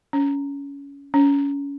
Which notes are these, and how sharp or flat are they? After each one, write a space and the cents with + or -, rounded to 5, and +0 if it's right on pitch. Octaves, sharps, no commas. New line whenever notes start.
C#4 +20
C#4 +25